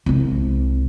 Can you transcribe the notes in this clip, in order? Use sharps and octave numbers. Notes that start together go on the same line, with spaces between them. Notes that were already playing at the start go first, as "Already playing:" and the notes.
C2 G#3